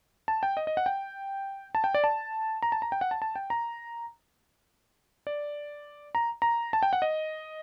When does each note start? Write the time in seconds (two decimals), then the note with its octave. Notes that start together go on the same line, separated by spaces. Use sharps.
0.28 A5
0.43 G5
0.57 D#5
0.67 D#5
0.77 F#5
0.86 G5
1.75 A5
1.84 G5
1.94 D5
2.04 A5
2.62 A#5
2.72 A5
2.82 A#5
2.92 G5
3.01 F#5
3.11 A5
3.22 A5
3.36 G5
3.50 A#5
5.27 D5
6.15 A#5
6.42 A#5
6.73 A5
6.83 G5
6.93 F#5
7.02 D#5